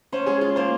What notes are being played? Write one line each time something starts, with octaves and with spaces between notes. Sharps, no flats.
C#4 C5
G#3 G#4
F4
A#3 C5